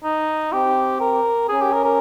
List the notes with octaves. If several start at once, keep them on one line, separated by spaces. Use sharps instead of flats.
D#4
C4 G4
A#4
C#4 G#4
G4
A#4
A#4